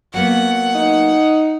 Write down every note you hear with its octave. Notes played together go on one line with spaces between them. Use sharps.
F#3 A#3 B3 F#5
D#4